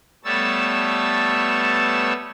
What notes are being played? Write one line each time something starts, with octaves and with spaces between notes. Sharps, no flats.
G3 A3 B3 C#5 A5 E6